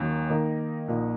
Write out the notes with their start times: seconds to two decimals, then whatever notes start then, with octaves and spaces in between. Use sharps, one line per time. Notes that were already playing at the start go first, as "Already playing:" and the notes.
Already playing: D#2 D#3 F#3 C#4
0.30 D#3 A#3 D#4 A#4 D#5
0.88 A#1 A#2 F3 A#3 D#4